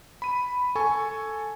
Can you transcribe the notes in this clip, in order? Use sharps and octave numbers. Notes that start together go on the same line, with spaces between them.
B5 D#7
A4 G#5 C#6